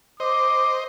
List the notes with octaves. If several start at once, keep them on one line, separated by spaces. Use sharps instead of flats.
C5 D#5 D6